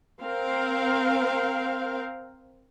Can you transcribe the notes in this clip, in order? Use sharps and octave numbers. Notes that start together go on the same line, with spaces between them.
C4 A#4 F5